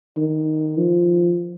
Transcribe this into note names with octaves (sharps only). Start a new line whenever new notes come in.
D#3
F3